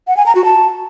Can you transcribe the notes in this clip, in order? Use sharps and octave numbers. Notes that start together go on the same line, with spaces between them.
F#5
G#5
A#5
F#4
A5